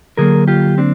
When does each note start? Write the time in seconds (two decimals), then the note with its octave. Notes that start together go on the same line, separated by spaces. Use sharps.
0.17 D3 F#3 A#3 G#4 A#4
0.48 F4 G4
0.78 C4 D4